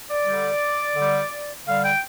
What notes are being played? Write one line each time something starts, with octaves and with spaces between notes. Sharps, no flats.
D5
D3 G3
D3 G3
D3 G3 F5
G5